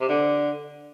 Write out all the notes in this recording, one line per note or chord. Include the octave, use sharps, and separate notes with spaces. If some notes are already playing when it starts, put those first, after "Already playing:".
C3
D3